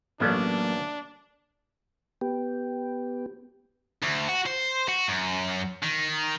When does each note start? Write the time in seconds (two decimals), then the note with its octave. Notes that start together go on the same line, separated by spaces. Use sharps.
0.20 A1 F#3 A#3 B3 C#4 D4 A4 D5
2.21 B3 G4
4.03 D2
4.29 F#4
4.46 C5
4.89 F#4
5.08 F#2
5.83 D#3